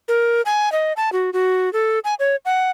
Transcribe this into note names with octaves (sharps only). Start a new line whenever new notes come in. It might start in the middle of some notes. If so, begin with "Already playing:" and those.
A#4
G#5
D#5
A5
F#4
F#4
A4
G#5
C#5
F#5